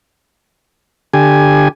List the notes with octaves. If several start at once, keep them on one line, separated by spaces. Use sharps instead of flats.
D3 G4 G#5